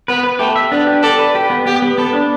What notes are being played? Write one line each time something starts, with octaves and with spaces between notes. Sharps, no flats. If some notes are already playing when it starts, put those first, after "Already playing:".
B3 B4
B4
A3 G4
E5
B3 D4
G4
A4 D5
B4
G4
B3
B3 G4
B3
B3 A4
D4